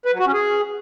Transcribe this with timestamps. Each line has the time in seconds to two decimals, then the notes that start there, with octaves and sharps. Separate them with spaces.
0.05 B4
0.12 F#3
0.19 F#4
0.26 C#4
0.33 G#4